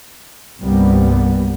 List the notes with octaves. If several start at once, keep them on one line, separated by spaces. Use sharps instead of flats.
C2 G2 C3 G3 A#3 B3